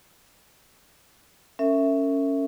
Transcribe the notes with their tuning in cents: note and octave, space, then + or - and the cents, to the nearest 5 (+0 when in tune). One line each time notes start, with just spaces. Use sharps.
C#4 +0 A#4 -40 E5 +0